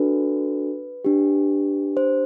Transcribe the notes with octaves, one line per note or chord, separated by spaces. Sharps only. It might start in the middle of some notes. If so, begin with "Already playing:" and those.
Already playing: D4 F#4 A4 B4
D4 G4
C5